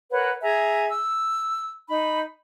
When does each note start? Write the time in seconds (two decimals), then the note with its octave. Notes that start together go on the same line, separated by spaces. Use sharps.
0.11 A#4 B4 C#5 F#5
0.42 G#4 E5 G#5 A#5
0.89 E6
1.89 D#4 B5